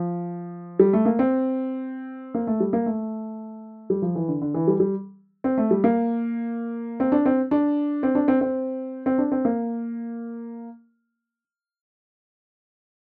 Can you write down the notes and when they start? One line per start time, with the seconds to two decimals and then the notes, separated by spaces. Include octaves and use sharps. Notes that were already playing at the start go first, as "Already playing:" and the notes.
Already playing: F3
0.79 G3
0.93 A3
1.05 A#3
1.19 C4
2.35 A#3
2.47 A3
2.60 G3
2.73 A#3
2.86 A3
3.90 G3
4.02 F3
4.15 E3
4.28 D3
4.42 D3
4.54 E3
4.68 G3
4.80 G3
5.44 C4
5.58 A3
5.71 G3
5.84 A#3
7.00 C4
7.12 D4
7.26 C4
7.51 D4
8.03 C4
8.15 D4
8.28 C4
8.41 C4
9.06 C4
9.18 D4
9.32 C4
9.45 A#3